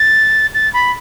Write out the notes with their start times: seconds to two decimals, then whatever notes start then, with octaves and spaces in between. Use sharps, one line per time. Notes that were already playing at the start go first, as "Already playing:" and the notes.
Already playing: A6
0.54 A6
0.74 B5